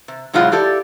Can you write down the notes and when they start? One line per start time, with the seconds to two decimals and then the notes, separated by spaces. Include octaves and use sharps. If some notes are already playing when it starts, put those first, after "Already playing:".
0.08 C3
0.33 A2 C3 F#3 G#3 F4 F#4
0.52 E4 G4 A4 D5